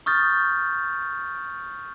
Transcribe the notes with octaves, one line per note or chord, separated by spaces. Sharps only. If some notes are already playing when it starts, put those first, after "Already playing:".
C#6 D#6 F6 G6 A6